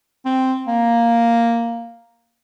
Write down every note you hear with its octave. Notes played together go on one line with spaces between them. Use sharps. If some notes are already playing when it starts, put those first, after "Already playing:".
C4
A#3